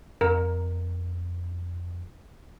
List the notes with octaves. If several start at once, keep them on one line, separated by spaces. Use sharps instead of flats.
F2 A#4